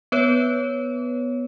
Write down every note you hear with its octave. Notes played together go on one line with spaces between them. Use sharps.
B3 B4 C#5